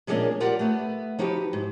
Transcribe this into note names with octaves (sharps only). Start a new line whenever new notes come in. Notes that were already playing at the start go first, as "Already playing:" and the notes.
A#2 F3 G#3 A#3 C#4 D4
F4 G4 A#4 D5 F#5
A3 B3
F3 D#4 F#4 G4 B4
G#2